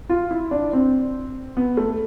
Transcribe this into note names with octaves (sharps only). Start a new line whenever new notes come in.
F4
E4
D4
C4
B3
A3